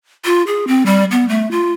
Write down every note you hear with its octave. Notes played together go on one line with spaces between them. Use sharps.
F4
G#4
C4
G3
B3
A3
F4